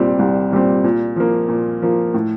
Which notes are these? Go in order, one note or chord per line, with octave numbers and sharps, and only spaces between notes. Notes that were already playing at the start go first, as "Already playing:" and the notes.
Already playing: C2 A#2 G3 C4
C2
A#2 G3 C4
A#2
F3 A#3
A#2
F3 A#3
A2